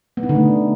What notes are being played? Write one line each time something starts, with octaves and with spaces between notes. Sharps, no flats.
B3
D#4
D3
A3